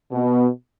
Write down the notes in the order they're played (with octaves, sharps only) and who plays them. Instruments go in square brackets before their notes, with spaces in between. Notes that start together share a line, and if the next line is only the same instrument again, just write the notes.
[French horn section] B2